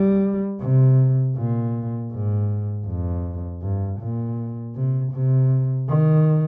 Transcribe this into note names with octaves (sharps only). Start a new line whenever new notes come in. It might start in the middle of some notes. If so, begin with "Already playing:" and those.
Already playing: G3
C3
A#2
G#2
F2
G2
A#2
C3
C3
D#3